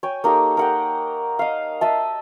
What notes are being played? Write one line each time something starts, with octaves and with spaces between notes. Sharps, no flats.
C#5 G5 G#5
A#3 D#4 G4 A4
A#4 F#5 G5
D#5 F5
D#5 E5 A5